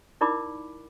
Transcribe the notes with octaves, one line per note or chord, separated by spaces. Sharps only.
D#4 E4 A#4 D5 B5 D6